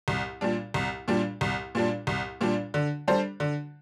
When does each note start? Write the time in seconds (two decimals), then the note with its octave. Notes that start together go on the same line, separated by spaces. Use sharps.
0.08 C2
0.41 A#2 G3 D4
0.74 C2
1.08 A#2 G3 D4
1.41 C2
1.75 A#2 G3 D4
2.07 C2
2.41 A#2 G3 D4
2.74 D3
3.08 G3 D4 A4 C5
3.40 D3